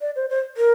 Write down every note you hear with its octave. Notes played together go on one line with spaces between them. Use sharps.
D5
C5
C5
A#4